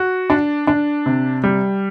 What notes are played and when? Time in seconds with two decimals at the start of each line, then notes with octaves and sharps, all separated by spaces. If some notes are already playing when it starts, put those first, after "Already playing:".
Already playing: F#4
0.30 D4
0.67 D4
1.06 C3
1.44 G3